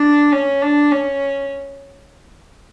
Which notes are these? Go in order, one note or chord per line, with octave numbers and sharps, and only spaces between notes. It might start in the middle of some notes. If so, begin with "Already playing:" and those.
Already playing: D4
C#4
D4
C#4